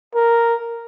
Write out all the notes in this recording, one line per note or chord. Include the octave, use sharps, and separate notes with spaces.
A#4